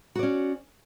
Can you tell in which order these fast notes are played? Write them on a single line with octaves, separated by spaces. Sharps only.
F#4 D5 C#4